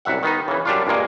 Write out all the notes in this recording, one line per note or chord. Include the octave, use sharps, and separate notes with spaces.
C2 F#2 E5 F#5
D#3 B3 D#4
C#3 E3
F#2 G3 D4 F4
G2 A#2 G#3 A#3